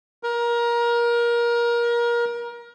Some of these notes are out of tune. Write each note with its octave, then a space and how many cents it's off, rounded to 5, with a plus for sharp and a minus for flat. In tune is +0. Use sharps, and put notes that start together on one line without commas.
A#4 +25